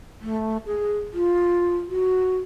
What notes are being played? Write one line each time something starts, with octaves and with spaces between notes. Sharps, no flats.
A3
G#4
F4
F#4